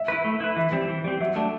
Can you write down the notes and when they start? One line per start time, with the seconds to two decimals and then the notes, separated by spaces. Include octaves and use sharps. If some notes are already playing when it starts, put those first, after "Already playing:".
Already playing: E5
0.08 E4 B4
0.24 A3
0.40 E4 B4
0.56 E3 E5
0.72 G3 C4
0.88 E3
1.04 G3 C4
1.20 F#3 E5
1.36 A3 D4